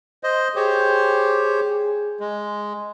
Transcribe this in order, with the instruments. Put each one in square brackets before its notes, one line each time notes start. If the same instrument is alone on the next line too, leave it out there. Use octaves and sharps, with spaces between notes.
[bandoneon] C5 D#5
[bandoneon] G4 C5 C#5 [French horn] G#4
[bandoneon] G#3